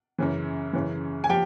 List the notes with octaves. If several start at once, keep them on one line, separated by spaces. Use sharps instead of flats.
F#2 C#3 E3
F#2 C#3 E3
G#5
F3 G4 G5